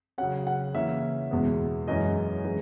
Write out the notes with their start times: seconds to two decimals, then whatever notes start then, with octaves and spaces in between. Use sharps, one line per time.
0.18 C#3 F#3 C#4 F#5
0.47 F#5
0.75 C#3 E3 A#3 C#4 E5
1.31 E2 B2 G#3 B3
1.88 F#2 E3 G#3 C#4 D#5
2.45 E3 G#3